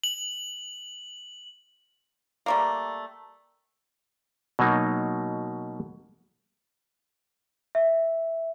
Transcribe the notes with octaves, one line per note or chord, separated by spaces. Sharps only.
F#7
G3 A3 A#3
B2 F#3 A#3 D#4
E5